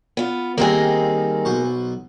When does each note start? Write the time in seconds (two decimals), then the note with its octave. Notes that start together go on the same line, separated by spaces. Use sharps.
0.17 B3 F4
0.58 D#3 G3 A#3 C4 D#4 G#4
1.45 B1 C5 C#6